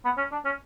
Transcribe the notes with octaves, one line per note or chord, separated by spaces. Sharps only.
B3
C#4
D4
C#4